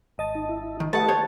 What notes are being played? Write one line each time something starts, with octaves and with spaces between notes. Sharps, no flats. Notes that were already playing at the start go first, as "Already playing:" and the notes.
G#1 D#5 A5
D#4
E4
D#3
A3 G4 A4 B4 D#5 F#5 A5
C5 C#5